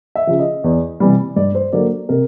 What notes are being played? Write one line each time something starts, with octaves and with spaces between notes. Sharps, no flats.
E5
C#3 F3
D#5
E2
C3 E3 G3
G2 D5
C5
D3 F#3 A#3 D5
C3 A#4